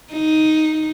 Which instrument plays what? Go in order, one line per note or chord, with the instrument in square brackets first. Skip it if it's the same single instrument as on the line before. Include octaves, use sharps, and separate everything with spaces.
[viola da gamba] D#4